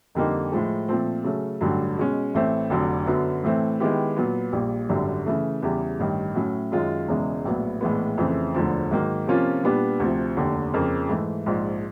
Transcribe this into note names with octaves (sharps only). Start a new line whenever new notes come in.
F2 D3 G3 A#3 D#4
A2 F3 G#3
A#2 F3 A3 C4
C#3 F#3 A3 C#4
A1 G2 D3 F#3
B2 G#3 C#4
A1 A2 E3 A3 C4
F1 F2 D3 F#3
F#2 D3 F#3 B3
A2 E3 A3 C4
D#3 G#3 B3 E4 G4
A#2 F#3 B3
A#1 A#2 G3
G#1 F#2 D3 G3
C#3 E3 A3
E2 C#3 E3 G3
A1 G2 D#3
A2 F#3 A3 C#4
F#2 D#3 G#3 C#4 F4
E1 E2 C#3 E3 G#3
A#1 A2 F#3 B3
A#1 A2 E3 G#3 B3
F2 C#3 E3 A3 C4
E1 D2 D3 F3
G#2 D#3 F#3 A#3
C3 F3 A#3 C#4 F4
A#2 G3 B3 D4 G4
D2 C3 F3
F1 D#2 D3
F2 C#3 F3 A#3
G#2 E3 A3
A#1 G#2 F3